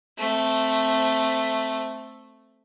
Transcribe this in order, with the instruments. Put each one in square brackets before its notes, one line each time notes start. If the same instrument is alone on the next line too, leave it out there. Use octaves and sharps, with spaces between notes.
[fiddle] A3 C4